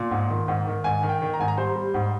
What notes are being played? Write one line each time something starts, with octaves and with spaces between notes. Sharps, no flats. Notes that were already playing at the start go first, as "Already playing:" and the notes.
Already playing: A#2 C6
G#2
D#3
G#2
D#3
G#2 G#5
D#3
G5
D#3
A#5
G#2 G#5
A#5
G3 C5
G3
G#2